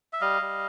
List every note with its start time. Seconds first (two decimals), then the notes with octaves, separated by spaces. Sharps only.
0.13 E5
0.21 G3 D#5 F5
0.42 G3